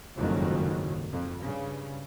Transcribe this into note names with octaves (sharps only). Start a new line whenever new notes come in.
F#1 C2 F2 G#2 D#3 F#3
F2
G2 C#3